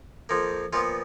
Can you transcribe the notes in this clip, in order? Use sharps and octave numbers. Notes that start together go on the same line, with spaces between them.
F2 F3 A#3
A#2 F3 B3 F4